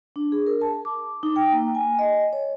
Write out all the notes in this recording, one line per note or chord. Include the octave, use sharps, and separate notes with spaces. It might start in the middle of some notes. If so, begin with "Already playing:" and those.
D4
G#4
A#4
A5
D6
D#4
G5
A#3
G#5
D#5
C#5